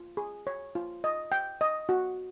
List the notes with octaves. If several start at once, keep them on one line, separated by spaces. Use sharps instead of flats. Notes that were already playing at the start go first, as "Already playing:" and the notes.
Already playing: F4
G#4
C#5
F4
D#5
G5
D#5
F#4